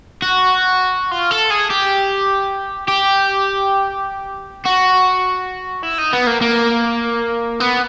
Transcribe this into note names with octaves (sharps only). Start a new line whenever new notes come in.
F#4
F4
A4
G#4
G4
G4
F#4
E4
D#4
B3
A#3
A#3
B3